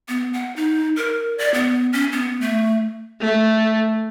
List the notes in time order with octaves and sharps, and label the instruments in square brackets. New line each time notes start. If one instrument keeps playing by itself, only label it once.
[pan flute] B3
F#5
D#4
A#4
D5
B3
C#4
B3
A3
[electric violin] A3